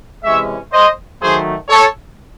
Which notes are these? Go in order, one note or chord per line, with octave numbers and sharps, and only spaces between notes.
C3 E3 G#3 C#4 C#5 E5
C5 D#5
D#3 F#3 A3 G#4 C5
A4 C#5